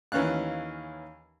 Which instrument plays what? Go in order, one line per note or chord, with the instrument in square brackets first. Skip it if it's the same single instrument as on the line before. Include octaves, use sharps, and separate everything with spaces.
[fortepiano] D#2 E3 C#4 F5 F#6